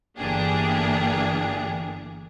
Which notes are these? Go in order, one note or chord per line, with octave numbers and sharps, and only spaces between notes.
G1 E3 A#3 D4 G4 G#4